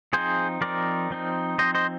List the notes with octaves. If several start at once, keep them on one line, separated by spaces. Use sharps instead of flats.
F3 C4 D#4 G#4 C5
F3 C4 D#4 A#4 D5
F3 C4 D#4
F3 C4 D#4 C5 D#5
C5 D#5